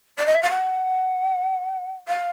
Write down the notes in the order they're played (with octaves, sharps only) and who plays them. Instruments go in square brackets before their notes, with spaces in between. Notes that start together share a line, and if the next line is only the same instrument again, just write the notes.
[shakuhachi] D5
D#5
E5
F5
F#5
F5